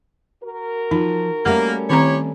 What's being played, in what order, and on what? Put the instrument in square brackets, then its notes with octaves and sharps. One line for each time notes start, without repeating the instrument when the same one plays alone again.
[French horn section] F#4 A#4
[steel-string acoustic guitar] F3 [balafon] D#4
[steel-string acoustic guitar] G3 A3 C#4 [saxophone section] A#3 [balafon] F#5
[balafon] D#3 C4 A#5 [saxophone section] E4 G4 C#5